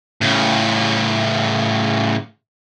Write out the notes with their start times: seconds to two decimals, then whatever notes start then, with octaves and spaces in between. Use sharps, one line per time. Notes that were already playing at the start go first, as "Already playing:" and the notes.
0.21 A2 C#3